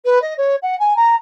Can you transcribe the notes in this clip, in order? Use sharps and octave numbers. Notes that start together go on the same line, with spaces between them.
B4
D#5
C#5
F#5
G#5
A#5